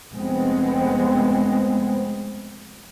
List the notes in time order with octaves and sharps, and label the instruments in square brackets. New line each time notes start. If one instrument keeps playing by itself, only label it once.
[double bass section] F1 G#3 B3 C4